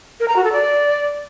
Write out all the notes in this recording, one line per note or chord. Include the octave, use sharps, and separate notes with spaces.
A#4
A#5
F#4
A4
D5